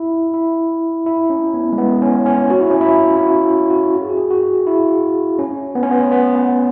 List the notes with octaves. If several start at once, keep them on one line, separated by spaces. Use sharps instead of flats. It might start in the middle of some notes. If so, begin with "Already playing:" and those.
Already playing: E4
E4
E4
C#4
B3
G#3
B3
C#4
C#4
F#4
E4
C#4
E4
E4
F#4
E4
F#4
G#4
F#4
G#4
F#4
E4
C#4
B3
C#4
B3
B3
B3